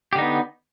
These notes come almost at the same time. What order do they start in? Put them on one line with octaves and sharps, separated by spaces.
G4 D3 D#4 B3